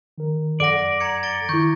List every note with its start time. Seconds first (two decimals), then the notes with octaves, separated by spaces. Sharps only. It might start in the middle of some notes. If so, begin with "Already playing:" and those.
0.18 D#3 A#4
0.60 F#2 A4 D5 F#5 D6 A#6
1.00 A#5 G#6 C#7
1.23 A6 D7 G7
1.49 D#3 E4 C#6 G6